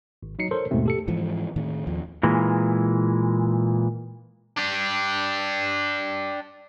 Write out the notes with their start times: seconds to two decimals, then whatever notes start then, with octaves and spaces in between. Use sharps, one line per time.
0.23 G#1
0.39 F#3 D#4 C7 C#7
0.51 A4 A#4 C5 C#5 C6
0.71 D#2 G#2 B2 A3 C4
0.86 G4 A4 C#7
1.08 G#2 E3 F3
1.56 A2 D#3
1.87 D#2 F3
2.23 A#2 E3 G#3
4.57 D4 G4